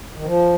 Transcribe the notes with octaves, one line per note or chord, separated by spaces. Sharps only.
D#3
F3